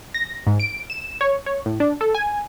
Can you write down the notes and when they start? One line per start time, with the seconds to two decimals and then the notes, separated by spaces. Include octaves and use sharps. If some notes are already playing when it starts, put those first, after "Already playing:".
0.14 A#6
0.47 G#2
0.60 D7
0.90 E7
1.21 C#5
1.46 C#5
1.66 A2
1.80 D4
2.01 A4
2.14 G#5